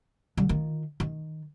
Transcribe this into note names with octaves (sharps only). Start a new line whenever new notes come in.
D3 G3
D#3 F4
D#3